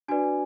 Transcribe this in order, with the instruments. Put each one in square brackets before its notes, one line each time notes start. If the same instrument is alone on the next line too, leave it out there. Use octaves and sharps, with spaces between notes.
[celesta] D4 F#4 B4 D5 G#5